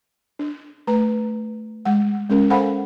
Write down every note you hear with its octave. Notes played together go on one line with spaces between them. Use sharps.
D4
A3 B4 A#5
G#3 F#5
G#3 C#4 A#4
A4 C5 F5 F#5 G#5 B5